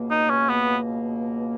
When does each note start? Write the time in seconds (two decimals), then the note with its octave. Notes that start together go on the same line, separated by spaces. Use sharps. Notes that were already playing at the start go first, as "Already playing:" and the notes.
Already playing: C#2 B2 A#3
0.10 D#4
0.30 C#4
0.49 B3